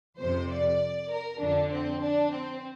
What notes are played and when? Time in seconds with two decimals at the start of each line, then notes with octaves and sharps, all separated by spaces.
0.19 F2 C3 C5
0.49 D5
1.09 A#4
1.39 F2 D3 D4
1.70 C4
2.00 D4
2.30 C4